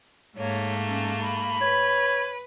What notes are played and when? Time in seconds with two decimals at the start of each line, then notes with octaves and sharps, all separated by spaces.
0.37 G#2 A3 A#3 C#5
0.88 C#4
1.21 B5
1.61 B4 C#5